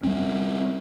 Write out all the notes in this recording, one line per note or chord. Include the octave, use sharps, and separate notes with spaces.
G3 G#3 C4 C#4